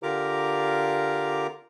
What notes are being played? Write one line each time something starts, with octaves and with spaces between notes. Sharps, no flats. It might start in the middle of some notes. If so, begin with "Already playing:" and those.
D3 F4 G4 A#4 A#5 D6